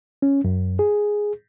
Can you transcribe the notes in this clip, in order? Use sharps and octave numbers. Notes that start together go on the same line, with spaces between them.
C#4
F#2
G#4